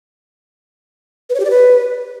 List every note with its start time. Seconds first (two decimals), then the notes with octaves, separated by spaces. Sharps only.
1.30 B4
1.35 C#5
1.40 G4
1.45 D5
1.50 B4